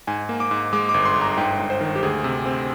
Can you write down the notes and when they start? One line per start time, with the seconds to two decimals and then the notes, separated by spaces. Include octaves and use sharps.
0.07 G#2 G#5
0.29 A#3
0.40 D6
0.51 G#2
0.73 G#3 D6
0.89 D6
0.94 G1
1.05 C6
1.16 G1
1.21 A#5
1.38 G#2 G5
1.59 G#2
1.70 C5
1.81 D#3
1.95 G4
2.03 D2 G#4
2.24 C3
2.46 C4